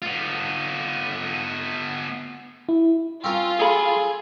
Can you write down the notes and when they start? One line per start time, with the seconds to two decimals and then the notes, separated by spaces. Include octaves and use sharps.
0.02 B3 F4
2.69 E4
3.24 C4 C#4 F4 A#4
3.59 G#4 A4 B5